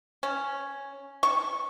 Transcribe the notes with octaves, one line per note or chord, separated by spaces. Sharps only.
C#4
C#6